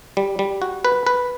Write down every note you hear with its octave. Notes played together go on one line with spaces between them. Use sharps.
G3
G3
F#4
B4
B4